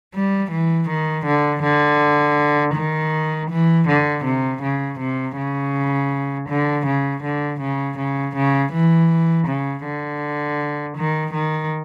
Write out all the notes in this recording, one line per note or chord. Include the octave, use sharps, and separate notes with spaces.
G3
E3
D#3
D3
D3
D#3
E3
D3
C3
C#3
C3
C#3
D3
C#3
D3
C#3
C#3
C#3
E3
C#3
D3
D#3
D#3